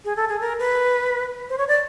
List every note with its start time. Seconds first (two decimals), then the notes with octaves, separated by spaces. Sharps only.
0.05 G#4
0.16 A4
0.29 G#4
0.40 A#4
0.59 B4
1.49 C5
1.58 C#5
1.68 D5